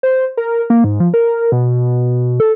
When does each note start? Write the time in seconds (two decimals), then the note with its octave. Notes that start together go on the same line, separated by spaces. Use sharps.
0.03 C5
0.37 A#4
0.70 A#3
0.84 G#2
1.00 F3
1.14 A#4
1.52 B2
2.40 A4